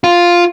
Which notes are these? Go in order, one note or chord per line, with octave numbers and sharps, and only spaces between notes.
F4